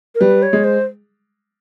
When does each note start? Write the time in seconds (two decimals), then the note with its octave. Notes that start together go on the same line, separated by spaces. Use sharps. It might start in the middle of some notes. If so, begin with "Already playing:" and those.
0.15 A#4
0.21 G3 B4
0.42 C#5
0.53 G#3
0.64 C5